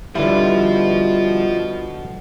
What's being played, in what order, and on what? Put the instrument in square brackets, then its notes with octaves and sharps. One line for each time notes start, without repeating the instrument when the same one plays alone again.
[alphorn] B2 [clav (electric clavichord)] D3 E4 [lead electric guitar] F3 F4 [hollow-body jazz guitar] G3 B4